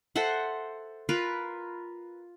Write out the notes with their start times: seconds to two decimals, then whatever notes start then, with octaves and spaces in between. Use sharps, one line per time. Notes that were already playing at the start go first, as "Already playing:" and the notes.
0.16 A4 C5 E5 F#5
1.09 F4 A#4 B4